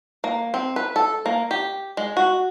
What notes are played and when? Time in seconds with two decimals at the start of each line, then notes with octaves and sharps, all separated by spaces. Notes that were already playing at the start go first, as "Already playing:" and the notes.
0.24 A#3
0.54 C4
0.76 B4
0.96 A4
1.26 A#3
1.51 G4
1.97 G#3
2.17 F#4